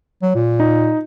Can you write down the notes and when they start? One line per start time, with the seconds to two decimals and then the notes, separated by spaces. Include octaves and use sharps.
0.22 F#3
0.35 A#2
0.60 D#4